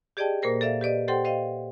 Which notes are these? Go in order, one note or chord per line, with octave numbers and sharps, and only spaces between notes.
G4 G#4 D5 D#5 G5 A5
A#2 A#3 A#4 C5 A#6
A4 D5 E5 F5
G4 B4 D5 D#5
G4 A4 C5 F#5 G5 C6
C5 D#5 F5 G5